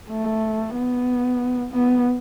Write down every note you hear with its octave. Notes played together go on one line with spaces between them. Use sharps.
A3
B3
B3